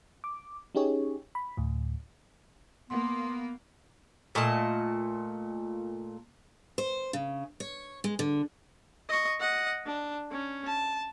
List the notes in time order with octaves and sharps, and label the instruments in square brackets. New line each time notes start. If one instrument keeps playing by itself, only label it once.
[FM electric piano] D6
C#4 D#4 G4 G#4 C#5
B5
D2 A2
[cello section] A#3 [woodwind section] B3 [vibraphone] C6
[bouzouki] A#2 A3 D#5 A5
[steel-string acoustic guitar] C5
C#3
C#5
G#3
D3
[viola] D#5 C#6
D#5 F#5
D4
C#4
A5